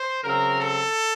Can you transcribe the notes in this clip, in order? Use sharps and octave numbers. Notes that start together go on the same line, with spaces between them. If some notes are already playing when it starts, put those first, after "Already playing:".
Already playing: C5
C#3 F#3 C4 A#4
A4